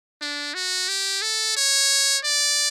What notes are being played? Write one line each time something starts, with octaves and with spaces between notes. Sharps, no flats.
D4
F#4
G4
A4
C#5
D5